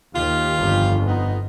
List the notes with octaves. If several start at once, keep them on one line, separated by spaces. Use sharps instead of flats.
D#2 F4 G4
G1 F2 D3
B3 D#4